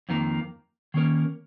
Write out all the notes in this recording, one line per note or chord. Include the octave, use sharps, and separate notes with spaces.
F2 D#3 A#3
D#3 A#3 C#4 A#4